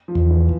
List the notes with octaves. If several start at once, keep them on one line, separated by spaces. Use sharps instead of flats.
F3
E2
E3